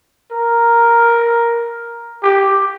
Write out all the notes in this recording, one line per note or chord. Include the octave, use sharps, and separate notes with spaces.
A#4
G4